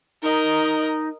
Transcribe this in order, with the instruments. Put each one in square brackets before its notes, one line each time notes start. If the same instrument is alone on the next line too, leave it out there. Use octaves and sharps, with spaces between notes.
[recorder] D#4 [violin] A#4 D#5